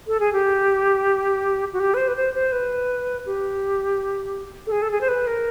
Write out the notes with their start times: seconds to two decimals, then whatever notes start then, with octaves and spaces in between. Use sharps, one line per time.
0.07 A4
0.20 G#4
0.33 G4
1.73 F#4
1.80 G4
1.94 B4
1.97 C5
2.08 B4
2.16 C5
2.35 C5
2.52 B4
3.26 G4
4.67 A4
4.72 G#4
4.82 A4
4.91 G#4
5.01 C5
5.08 B4
5.27 A#4